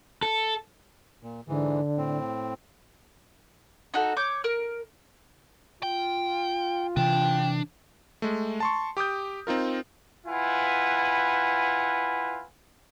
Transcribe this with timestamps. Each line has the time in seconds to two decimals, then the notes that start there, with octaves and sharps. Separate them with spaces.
0.23 A4
1.23 A#2
1.48 G#2 D3 E3
1.97 A2 C4
3.94 D#4 F#4 A4
4.17 C#5 D6 G6
4.44 A#4
5.83 F4 G5
6.97 C3 E3 D4 G5
8.22 G#3 A3
8.60 A5 C6 C#6
8.97 G4 D6 D#6 G6
9.47 C4 D#4 F4 A#4
10.27 E4 F4 B4 F#5 G#5